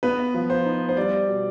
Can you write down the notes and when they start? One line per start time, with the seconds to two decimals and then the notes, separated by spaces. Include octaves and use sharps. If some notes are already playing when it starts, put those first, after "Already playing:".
0.03 B3 B4
0.34 F3
0.50 C5
0.65 D#4
0.89 C5
0.96 G3 D5
1.28 B2